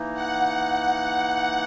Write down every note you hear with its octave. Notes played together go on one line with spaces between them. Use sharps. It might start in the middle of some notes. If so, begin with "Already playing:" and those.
Already playing: E3 A#3 D#4
F#5